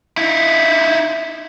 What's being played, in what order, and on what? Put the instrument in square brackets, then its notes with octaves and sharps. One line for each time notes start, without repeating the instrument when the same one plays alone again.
[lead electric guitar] D#4 E4